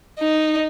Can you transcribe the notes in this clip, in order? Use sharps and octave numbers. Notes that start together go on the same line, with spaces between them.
D#4